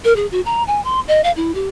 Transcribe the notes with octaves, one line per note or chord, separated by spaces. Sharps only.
A#4
G#4
F#4
A#5
G#5
C6
D#5
F5
E4
G4